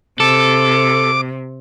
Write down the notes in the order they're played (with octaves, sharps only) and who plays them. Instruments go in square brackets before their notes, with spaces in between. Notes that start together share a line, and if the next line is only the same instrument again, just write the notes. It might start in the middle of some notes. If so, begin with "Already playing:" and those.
[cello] C3 [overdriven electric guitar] A4 [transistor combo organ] D6